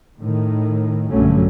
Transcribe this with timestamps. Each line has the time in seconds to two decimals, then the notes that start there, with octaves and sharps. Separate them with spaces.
0.19 A2 D#3
1.10 A#1 G2 D3 F#3 A3 C#4